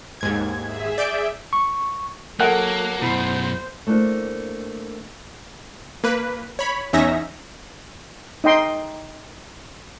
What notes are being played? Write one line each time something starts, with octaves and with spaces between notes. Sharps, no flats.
D#2 G#2 G#6
G#4 E5
D5 G6 D7
C#6
F#3 A#3 A4 A#4 F#5 F#6 D7
F#2 B2 E4 C5 B5 C7
A3 A#3 D4 E4 C5
A#3 B4
C#5 B5
E2 C#4 D#4 E5 A#6
D#4 D#5 G5 C6